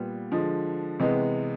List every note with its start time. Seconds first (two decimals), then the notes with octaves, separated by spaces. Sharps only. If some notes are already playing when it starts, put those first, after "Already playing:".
Already playing: A#2 G3 B3
0.32 D3 F3 G#3
1.00 C3 E3 G#3 B3